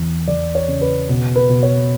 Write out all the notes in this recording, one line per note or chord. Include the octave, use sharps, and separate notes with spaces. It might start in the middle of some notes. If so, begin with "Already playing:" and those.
Already playing: E2 E3
E2 D5
C#5
C#3
B4
B2
B4
B2
C#5